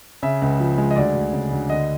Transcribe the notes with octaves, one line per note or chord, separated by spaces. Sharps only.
C#3 E5
C#2
F3
G#3
D#5
D2 D5
D2
C#3
D2
D3 D#5